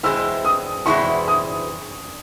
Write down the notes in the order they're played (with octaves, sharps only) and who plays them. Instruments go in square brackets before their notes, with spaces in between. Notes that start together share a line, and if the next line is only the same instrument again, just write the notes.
[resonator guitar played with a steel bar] E2 B2 G#3 C4 E4 [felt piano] E6
[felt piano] D#6
[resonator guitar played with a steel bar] E2 B2 G#3 C4 E4 [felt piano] C#6
[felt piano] D#6